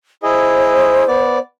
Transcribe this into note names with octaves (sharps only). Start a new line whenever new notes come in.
E4 G#4 C5 D#5
B3 D5